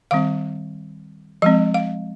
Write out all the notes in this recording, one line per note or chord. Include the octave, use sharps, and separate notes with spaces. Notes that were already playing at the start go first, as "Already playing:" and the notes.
D#3 G3 C4 F5
F3 G#3 C4 D#5
F5